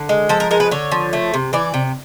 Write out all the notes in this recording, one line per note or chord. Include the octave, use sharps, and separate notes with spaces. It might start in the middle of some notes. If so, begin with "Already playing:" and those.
Already playing: D3
G#3
F3 A4
A#4
G#3 A#4
B4
D3 C#5
F3
A3
C3
E3 D5
C3